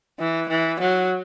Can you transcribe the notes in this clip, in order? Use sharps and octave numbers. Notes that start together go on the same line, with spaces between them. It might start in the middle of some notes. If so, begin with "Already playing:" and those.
E3
E3
F#3